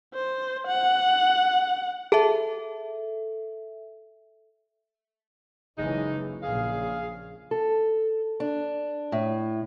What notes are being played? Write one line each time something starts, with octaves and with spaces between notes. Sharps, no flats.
C5
F#5
G#4 A4 E5 A5
F#1 C#3 E3 G#3 D#4
A#1 C#3 G#4 F5
A4
D4
A2